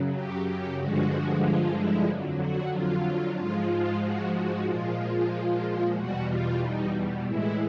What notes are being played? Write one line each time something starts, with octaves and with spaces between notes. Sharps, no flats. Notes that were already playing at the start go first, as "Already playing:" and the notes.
Already playing: F#2 C#3 F#3
G4
G4
G2 D3 F3 G#3 F#4
F4
E4
F2 D3 F#3
F#4
F4
G#2 F3 G#3 F4
F#4
F#4
A#2 F3 G#3 F4
E2 B2 G3 F#4
F4
D#4
A2 E3 G#3 E4